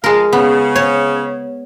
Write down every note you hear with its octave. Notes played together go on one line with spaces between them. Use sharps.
F3 G#3 A#4 F5
C#3 B3
C#5